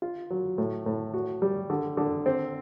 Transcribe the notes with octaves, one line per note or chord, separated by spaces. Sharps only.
F4
F#3
A2
A2
F#4
G3
D3
D3
C4